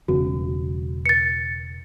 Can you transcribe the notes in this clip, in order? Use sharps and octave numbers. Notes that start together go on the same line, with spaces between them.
E1 C#3 B3 F#4
A6 C#7